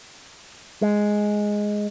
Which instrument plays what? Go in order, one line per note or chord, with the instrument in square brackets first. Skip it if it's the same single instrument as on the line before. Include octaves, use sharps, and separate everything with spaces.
[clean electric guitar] G#3